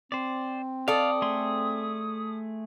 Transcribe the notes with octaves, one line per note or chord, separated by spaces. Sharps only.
C4 C5 D5
A4 D5 F5 D#6
A3 G#4 C6